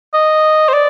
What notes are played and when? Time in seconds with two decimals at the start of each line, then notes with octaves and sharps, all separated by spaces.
0.14 D#5
0.69 C5
0.73 D5